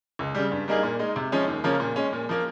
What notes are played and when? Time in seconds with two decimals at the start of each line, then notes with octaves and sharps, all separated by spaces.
0.19 C#2
0.35 C#3 G3
0.52 G2
0.68 G3 A#3 D#4 G#4
0.83 A#2
0.99 G#3 D#4
1.16 C3
1.32 F3 G#3 C#4
1.48 D#2
1.64 C#3 F3 A#3 C#4
1.80 A#2
1.96 G#3 C#4
2.13 A#2
2.29 F3 A#3